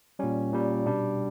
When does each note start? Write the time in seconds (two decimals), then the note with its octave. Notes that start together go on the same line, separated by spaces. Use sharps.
0.19 A#2 G3 C#4
0.52 A#2 G3
0.86 B2 G3 D4